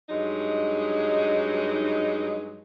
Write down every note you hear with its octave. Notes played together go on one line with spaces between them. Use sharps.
G2 F#3 G#3 D#4